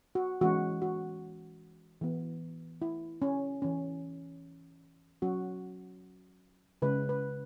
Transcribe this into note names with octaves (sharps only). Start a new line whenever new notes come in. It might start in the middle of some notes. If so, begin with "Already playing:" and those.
F#4
E3 G#3 C#4 F#4
F#4
E3 B3
E4
C#4
E3 C#4
F#3 C#4 F#4
C#3 G#3 C#4 B4
B4